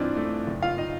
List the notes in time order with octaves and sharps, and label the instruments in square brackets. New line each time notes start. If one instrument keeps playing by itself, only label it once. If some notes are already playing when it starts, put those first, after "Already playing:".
Already playing: [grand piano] G2 E3 C4 D4 D#4 F4 D5
A3
F#1
F4 F5
D#4 D#5